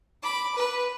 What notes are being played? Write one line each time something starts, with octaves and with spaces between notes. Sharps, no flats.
B5 D6
B4